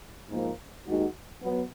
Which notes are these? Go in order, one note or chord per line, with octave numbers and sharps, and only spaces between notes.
G#2 F3 A#3
D#2 D#3 G#3 D#4 F#4
F#3 B3